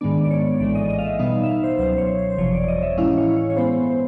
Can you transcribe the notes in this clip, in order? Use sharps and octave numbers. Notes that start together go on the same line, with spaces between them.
G#2 D#3 G#3 B3 D4 D5
D5
C#5
A#1 A2 E3 G#3 D5
D#5
D#5
F5
E5
B2 G3 B3 D#4 F5
E5
F5
C5
C#2 B2 F#3 C5
C#5
C5
C5
G1 F2 C3 F3 C#5
D5
D#5
E5
A2 E3 G#3 C#4 E4 F5
C#5
C#5
C#5
G2 E3 G#3 B3 C5
C5